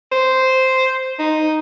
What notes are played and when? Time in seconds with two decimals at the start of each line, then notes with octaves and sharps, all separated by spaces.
0.12 C5
1.19 D#4